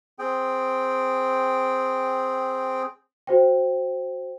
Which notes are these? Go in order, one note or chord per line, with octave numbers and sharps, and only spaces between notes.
C4 G#4 G5
F#4 C5 G5